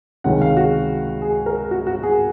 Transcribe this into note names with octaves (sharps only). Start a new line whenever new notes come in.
C#2 C3 D#3 G#3 C#4 F#5
F5
F#4
G#4
A#4
F#4
F#4
G#4